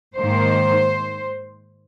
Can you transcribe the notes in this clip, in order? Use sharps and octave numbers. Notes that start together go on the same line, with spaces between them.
G#2 D#3 A#3 C5